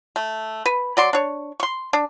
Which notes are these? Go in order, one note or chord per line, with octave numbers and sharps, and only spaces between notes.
A3
B4
F#3 D5 C6
D4 C#5
C6 C#6
D4